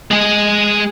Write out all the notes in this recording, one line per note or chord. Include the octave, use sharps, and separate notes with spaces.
G#3 G#4